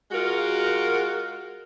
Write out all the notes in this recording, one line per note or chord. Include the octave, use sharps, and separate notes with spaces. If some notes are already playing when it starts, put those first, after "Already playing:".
G#3 F4 F#4 A#4